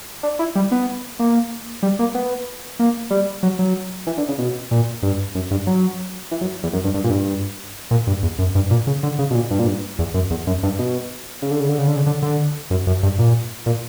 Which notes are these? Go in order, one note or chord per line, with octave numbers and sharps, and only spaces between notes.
D4
E4
G3
B3
A#3
G3
A#3
B3
A#3
G3
F#3
F#3
E3
D3
C#3
B2
A#2
G2
F#2
G2
F#3
E3
F#2
E2
F#2
G2
G2
A#2
G2
A#2
G2
E2
F#2
G2
A#2
C#3
D3
C#3
B2
A#2
G2
A#2
G2
E2
F#2
E2
F#2
G2
B2
C#3
D3
C#3
D3
C#3
D3
C#3
D3
D3
F#2
F#2
G2
A#2
A#2